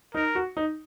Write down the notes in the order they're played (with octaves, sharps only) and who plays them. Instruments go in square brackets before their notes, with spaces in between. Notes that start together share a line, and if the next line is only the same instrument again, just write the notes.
[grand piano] D#4 [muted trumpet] A#4
[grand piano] F#4
D#4